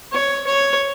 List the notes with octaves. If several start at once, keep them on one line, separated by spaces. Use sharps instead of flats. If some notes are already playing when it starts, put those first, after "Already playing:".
C#5
C#5